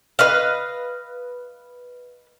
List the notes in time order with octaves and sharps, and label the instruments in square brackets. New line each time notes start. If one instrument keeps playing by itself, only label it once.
[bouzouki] B4 D#5 F5